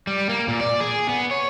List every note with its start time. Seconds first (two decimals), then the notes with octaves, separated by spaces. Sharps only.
0.07 G3
0.29 A#3
0.48 A#2
0.61 D5
0.80 G#4
1.09 B3
1.31 C#5